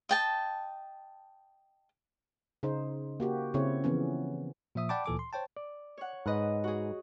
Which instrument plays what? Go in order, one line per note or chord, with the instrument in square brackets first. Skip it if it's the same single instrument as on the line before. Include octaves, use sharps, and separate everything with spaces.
[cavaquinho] D#5 G5 A5
[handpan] C#3 D#4 C5
A#3 F#4 G4
C#3 C4 E4 C#5
E3 F3 B3 C#4
[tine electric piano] A#2 F3 E5 D#6
D5 F#5 G5 A5 B5 D6
D2 A#2 E3 A4 G#5 D6
C6
C5 C#5 G5 A5
[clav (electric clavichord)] D5
[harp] C#5 F#5
[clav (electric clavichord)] G#2 B4 [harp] D#5 F#6
[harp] F#4 G#4